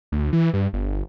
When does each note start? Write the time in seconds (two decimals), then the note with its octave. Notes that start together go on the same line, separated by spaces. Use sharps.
0.12 D2
0.33 E3
0.53 G2
0.73 G1